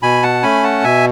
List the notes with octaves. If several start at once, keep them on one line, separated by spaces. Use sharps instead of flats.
B2 G#5 B5
F#5 A5
A3 C#4 G#5 B5
F#5 A5
B2 E5 G#5